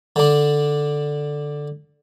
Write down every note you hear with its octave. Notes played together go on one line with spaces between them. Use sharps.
D3 D4